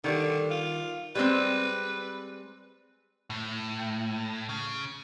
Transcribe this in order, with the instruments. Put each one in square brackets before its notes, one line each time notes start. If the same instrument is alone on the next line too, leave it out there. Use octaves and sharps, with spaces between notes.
[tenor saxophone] D3 [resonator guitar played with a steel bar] D#3 G3
[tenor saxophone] F4
[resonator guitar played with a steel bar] G3 G#3 C4 [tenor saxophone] B4
[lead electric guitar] A2
C#3